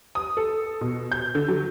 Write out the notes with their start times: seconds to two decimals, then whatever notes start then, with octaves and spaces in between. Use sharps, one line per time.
0.15 D#6
0.37 A4
0.81 B2
1.12 G6
1.35 D3
1.48 F#3